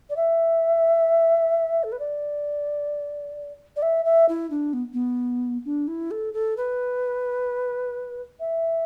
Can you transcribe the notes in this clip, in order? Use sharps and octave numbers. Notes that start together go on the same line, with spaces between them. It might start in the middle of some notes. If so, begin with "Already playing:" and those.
D5
E5
A4
B4
D5
D5
E5
E5
E4
D4
B3
B3
D4
E4
A4
A4
B4
E5